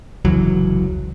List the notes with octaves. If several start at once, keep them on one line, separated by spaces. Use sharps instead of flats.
F1 C#2 E3 F#3